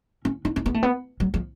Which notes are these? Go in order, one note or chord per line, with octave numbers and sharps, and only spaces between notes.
C#4
D4
C#4
B3
A3
B3
F#3
F3